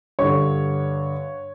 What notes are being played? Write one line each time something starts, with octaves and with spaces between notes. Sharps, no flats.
G2 D3 C#5 C#6